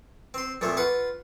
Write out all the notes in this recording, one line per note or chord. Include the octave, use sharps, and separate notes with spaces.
C4 C6
F2 A#2 F3 A3
F4 B4 F#5